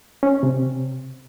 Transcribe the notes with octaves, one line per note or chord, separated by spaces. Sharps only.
C#4
C3